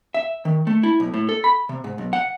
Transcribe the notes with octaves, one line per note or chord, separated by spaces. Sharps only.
E5
D#3
A3
E4
B1
A2
A4
B5
C3
G#2
B1
F#5